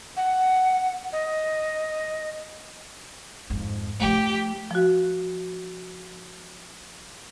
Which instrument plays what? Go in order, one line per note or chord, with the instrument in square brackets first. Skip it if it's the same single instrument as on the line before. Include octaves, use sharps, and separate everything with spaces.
[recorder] F#5
D#5
[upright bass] F2 G#2
[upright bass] F3 A3 [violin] G4
[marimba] F3 F#4